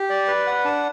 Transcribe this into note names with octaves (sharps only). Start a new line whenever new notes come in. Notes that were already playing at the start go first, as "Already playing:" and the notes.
Already playing: G4
D5
B4
F#5
D4